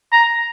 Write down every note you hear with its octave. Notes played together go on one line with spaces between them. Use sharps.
A#5